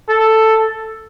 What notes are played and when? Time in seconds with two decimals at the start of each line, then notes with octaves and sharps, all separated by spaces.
0.09 A4